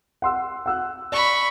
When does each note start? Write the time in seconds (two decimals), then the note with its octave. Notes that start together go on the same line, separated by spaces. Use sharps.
0.22 F#5 C6 E6
0.66 F#5 E6 F#6
1.12 D5 B5 C#6